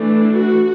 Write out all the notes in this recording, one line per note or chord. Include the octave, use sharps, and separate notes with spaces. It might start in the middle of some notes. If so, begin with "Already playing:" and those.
Already playing: E3 A3 D4
F#4